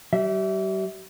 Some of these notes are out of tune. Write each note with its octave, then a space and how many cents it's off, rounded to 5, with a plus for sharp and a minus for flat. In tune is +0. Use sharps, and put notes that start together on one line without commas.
G3 -40 E5 -15